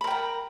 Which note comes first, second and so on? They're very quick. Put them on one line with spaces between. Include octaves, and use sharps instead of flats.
B5 A#4 G5 A#5